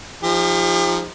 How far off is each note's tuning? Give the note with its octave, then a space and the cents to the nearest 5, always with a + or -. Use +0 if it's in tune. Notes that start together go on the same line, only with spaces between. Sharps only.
F3 +0 D#4 +0 G4 +45